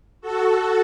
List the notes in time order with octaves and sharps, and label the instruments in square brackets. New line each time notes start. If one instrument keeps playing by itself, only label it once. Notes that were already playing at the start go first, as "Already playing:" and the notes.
[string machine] F#4 A4